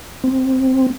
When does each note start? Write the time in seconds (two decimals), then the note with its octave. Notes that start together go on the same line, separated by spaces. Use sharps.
0.24 C4